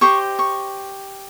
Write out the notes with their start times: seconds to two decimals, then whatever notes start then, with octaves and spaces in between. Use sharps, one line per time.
0.01 G4 C5 D#5 C#6
0.39 C#6